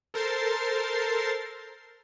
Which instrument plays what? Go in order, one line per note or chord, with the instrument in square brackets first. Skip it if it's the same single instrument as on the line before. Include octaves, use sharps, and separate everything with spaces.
[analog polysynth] A4 A#4 C5 A6 C7